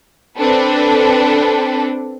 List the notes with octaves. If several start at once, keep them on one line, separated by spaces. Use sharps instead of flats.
C4 D4 A4 B4